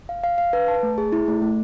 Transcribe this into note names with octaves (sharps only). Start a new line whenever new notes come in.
F5
F5
F5
B4
A5
A3
G#4
E4
A3
A3